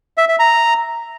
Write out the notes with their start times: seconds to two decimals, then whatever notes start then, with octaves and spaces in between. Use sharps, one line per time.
0.18 E5
0.28 E5
0.39 A#5